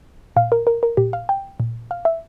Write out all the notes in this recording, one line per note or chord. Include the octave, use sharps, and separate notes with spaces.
A#2 F5
A#4
A#4
A#4
A#2 G4
F5
G5
A#2
F5
E5